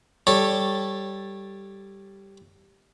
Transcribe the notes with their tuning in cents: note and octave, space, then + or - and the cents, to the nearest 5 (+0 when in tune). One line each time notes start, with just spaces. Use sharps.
G3 +0 A4 +0 C#5 -15